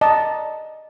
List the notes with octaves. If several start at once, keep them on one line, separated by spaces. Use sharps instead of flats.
D5 D#5 A5 A#5